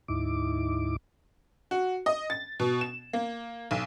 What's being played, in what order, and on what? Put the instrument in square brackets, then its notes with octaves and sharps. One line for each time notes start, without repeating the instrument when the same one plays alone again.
[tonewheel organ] D2 G#2 D#4 E4 D6
[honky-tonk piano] F#4
D#5
A6
B2
E7
A#3
B1